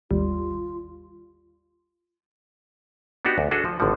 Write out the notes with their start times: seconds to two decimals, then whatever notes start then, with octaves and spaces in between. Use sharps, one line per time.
0.11 G#1 D#2 G3 F4
3.25 B3 D4 D#4 F#4 G4
3.38 D2
3.51 D4 F#4 G#4 A4
3.65 F3
3.80 G#1 A2 D3 F3